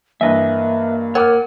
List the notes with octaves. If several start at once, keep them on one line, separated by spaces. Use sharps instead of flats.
G2 E3 A#3 B4 D#5 E5
A#4 C#5 F#5 D6 F6